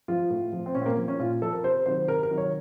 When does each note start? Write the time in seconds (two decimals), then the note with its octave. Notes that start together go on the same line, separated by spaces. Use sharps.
0.08 F3 F4
0.30 A2
0.52 F3
0.66 C4
0.75 A#2 C#4
0.82 C4
0.86 A#3
0.97 F3
1.08 C#4
1.19 A#2 F4
1.41 F3 A4
1.53 A#4
1.64 C3 C5
1.86 D#3 F#3 C5
2.08 C3 A#4
2.23 A#4
2.31 D#3 F#3
2.38 C#5